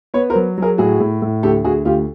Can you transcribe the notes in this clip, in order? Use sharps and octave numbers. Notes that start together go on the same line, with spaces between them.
B3 B4 C#5
A#4 C5
F#3
F#3 G#4 A#4
A2 F#4 G#4
A2
A2
D2 G4 A4
D2 F#4 G#4
D2 F4 G4